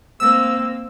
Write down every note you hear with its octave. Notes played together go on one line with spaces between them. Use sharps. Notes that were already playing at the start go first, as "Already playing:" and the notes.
A#3 C4 E6